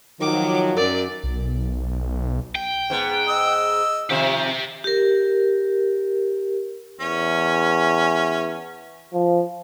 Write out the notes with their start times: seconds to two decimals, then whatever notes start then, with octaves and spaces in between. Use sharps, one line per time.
0.21 D#3 F3 F#3 D6
0.77 F#2 A#4 D5
1.23 B1
2.55 G5
2.90 G#2 B3
3.28 D#5 E6
4.10 C3 D#3 F3 G4 E5
4.84 G4 A#4
7.00 E2 C#4
9.13 F3